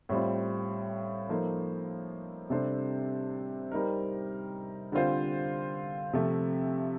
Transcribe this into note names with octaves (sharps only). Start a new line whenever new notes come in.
A2 G3 C4 F4
F3 A#3 D#4 A4 C5
C3 G3 D4 A4 C5
G3 C4 D#4 A#4
D3 G3 C4 F4 C5
C3 F3 A3